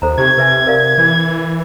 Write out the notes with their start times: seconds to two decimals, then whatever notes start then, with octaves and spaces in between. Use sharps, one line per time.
0.02 D#2 A4 C5 A#5
0.17 C3 D#4 G4 C#6 G#6
0.38 C3 B4 E5 G#5
0.67 A#4 D5 F5
0.98 E3